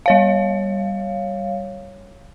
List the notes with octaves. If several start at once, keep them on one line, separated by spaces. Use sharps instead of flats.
G3 C#5 F5